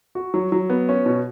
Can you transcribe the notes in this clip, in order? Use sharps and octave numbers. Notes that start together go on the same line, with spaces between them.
F#4
F#3
F#3
B3
C#4
B2